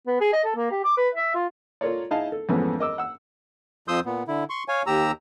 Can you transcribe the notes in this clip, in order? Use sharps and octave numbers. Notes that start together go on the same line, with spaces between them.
B3
G#4
D#5
A4
A#3
G4
D6
B4
E5
F4
F4 A4 A#4 C#5 D5
D#4 E4 G#4 D#5 F5 A5
A4
F2 G#2 E3 A3 B3 C#4
A#4 D#5 D6 E6
F#5 E6
F2 F3 C6 D#6 E6 G6
A#2 B3
D3 E4
C6 C#6
C#5 F5 G#5
D#2 G4 A#5 E6